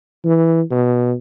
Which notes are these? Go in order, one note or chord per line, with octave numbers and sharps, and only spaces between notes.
E3
B2